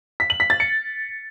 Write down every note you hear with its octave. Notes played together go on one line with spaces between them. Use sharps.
B6
F#7
B6
A6
C#7